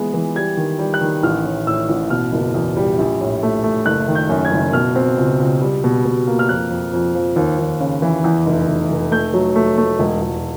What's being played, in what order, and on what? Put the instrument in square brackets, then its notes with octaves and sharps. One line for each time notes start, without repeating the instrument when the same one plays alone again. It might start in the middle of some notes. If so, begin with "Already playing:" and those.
Already playing: [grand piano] E3 G#3 B3
E3
G3 G#6
D#3
G3
F#6
D#3
A1 F6
A2
A2 E6
A1
B2 F6
F#1
E2
G3
A#1
A2
A3
A3
F#1 F#6
D#3
G6
F#2
G#6
F#1
B2 F6
C4
C#2
C#2
G3
B2
B2
A#3
F6
F2 F#6
F2
F2
F3
D#2
D#2
C#3
E3
E2
F1
F1
F1
A3 G6
F#3
A3
A3
E1
E1